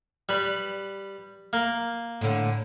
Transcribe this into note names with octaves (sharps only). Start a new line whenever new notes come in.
G3 B4
A#3
A2 D3